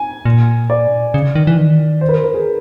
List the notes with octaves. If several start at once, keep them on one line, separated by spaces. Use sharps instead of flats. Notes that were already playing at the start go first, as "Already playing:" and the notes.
Already playing: G#5
A#2
D5
C#3
D#3
E3
D#3
C5
B4
A#4
A#4
G#4